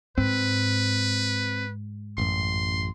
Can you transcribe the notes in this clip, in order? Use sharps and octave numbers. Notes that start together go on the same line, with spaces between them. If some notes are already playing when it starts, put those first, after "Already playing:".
G#2 C4 B4
A1 F#2 C6